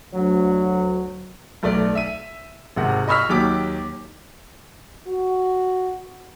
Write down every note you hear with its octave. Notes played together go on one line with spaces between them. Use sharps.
D2 F#3
B1 A3 D5
E5 D#7
G#1 C3 F#5
D#5 B5 C#6 E6 F6 B6
D#2 F#3 G4 D6
F#4